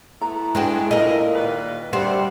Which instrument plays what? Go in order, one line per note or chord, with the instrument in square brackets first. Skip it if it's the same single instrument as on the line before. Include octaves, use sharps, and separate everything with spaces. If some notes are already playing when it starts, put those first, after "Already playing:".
[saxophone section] A3 B3 E4 [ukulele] A#5
[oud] G#3 D4 F#4 [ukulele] B4 G5 G#5
[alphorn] A#2 [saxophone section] C#3 F3 E4 [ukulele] A4 E5 [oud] A#4 D#5
[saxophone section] D#3 G3 B4
[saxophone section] D2 C3 F#5 [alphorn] G3 [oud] C4